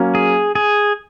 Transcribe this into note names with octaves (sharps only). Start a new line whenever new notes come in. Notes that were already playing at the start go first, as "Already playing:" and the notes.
Already playing: F#3 A#3 C#4
G#4
G#4